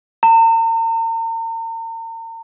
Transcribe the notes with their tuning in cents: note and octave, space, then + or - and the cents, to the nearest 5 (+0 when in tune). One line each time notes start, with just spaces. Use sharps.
A#5 -40